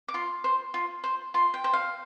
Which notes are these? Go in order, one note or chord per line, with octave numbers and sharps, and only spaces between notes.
D6
F4 C6
C5
F4
C5
F4 C6
G5
C5
F5